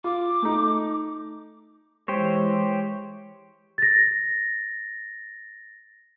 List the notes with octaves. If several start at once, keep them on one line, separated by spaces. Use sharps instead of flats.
F4 D6
A3 D#4
E3 G#3 G4 C5 C#5
A6 A#6